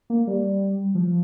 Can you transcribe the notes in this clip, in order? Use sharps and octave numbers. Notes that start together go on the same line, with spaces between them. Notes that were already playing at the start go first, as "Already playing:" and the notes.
A#3
G3
F3